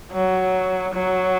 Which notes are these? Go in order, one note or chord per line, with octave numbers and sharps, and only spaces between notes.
F#3
F#3